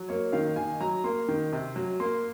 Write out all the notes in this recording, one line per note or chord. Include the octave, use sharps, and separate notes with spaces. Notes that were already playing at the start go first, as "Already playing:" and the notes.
Already playing: F#3
A#3 C#5
D#3 F5
D#3 G#5
F#3 A#5
A#3 C6
D#3
C3
F#3
A#3 C6